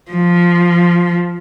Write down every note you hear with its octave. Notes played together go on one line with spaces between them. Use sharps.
F3